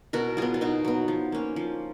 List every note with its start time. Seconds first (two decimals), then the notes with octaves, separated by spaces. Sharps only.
0.13 B2 F#4 A#4
0.37 F#3 B3 F4 G#4
0.54 F4
0.61 B2 D#4 F#4
0.85 F#3 B3
1.08 F3
1.32 A#3 C#4
1.56 F3